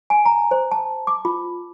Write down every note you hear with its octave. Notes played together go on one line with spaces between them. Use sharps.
G#5
A#5
C5
A5
D6
F4